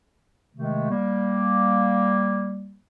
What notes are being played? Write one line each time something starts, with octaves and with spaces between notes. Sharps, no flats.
C3 D#3 G#3 A3
G3 A#3